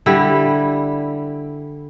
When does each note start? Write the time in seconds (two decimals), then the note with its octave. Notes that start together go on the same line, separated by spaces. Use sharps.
0.06 D3 G3 E4